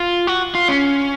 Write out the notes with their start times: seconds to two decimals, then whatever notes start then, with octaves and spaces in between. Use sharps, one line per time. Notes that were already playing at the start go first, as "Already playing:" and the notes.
Already playing: F4
0.27 F#4
0.55 F4
0.68 C#4